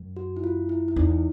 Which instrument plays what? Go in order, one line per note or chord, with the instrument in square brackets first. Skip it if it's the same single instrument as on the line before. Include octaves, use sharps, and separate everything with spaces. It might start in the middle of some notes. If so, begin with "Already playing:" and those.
Already playing: [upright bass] F#2
[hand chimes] F#4
E4
F4
E4
E4
[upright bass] E2 [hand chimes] D#4